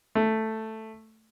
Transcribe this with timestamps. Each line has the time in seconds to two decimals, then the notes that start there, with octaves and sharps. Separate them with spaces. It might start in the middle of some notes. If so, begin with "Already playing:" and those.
0.15 A3